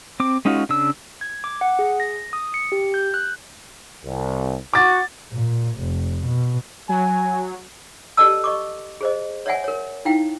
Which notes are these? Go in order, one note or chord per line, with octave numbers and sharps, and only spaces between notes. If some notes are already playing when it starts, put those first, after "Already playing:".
C4 D6
G#3 C#4 D#4 F4 F#4
C#3 D4 E6
G#6
D6
F#5
G#4
A#6
D#6
C#7
G4
G6
F#6
C2
F#4 D6 A6
A#2
F1
B2
F#3 G#5
G4 A4 D5 D#5 A5 E6
D#5 C#6 D6
G#4 C5 D#5
C#5 D5 E5 F#5 G#5
A#4 C#5
D#4 E4 F5 G5